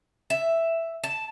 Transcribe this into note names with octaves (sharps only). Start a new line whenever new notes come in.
E5
A5